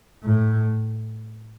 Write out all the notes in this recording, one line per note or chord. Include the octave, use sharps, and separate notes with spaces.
A2